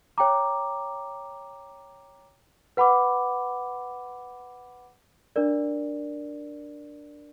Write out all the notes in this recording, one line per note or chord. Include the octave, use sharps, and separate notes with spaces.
C#5 G5 A#5 D6
B4 F#5 B5 D6
D4 A#4 D5